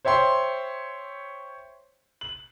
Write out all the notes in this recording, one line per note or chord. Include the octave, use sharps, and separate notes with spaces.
C5 C#5 E5 G5 C6
F#7